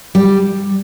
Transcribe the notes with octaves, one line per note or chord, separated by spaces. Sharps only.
G3